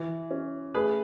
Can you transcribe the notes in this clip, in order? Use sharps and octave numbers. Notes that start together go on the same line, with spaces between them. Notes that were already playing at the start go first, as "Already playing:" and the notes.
Already playing: E3
C#4
A3 G#4 B4